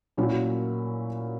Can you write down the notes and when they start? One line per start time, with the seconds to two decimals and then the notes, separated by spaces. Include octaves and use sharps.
0.17 A#2 F#3 C#4 E4